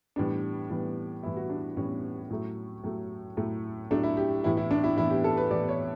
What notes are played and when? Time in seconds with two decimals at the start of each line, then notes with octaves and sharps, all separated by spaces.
0.16 A2 E3 G3 B3 D4
0.70 A2 E3 G3 B3
1.23 A2 E3 G3 B3 E4
1.37 F#4
1.50 D4
1.77 A2 E3 G3 B3 C#4
2.30 A2 F#3 A3
2.84 A2 F#3 A3
3.37 A2 F#3 A3
3.90 A2 F#3 A3 D4
4.03 E4
4.17 G4
4.44 A2 E3 B3 E4
4.57 E4
4.71 D4
4.84 E4
4.97 A2 E3 B3 E4
5.10 G4
5.24 A4
5.37 B4
5.51 A2 E3 B3 D5
5.69 C#5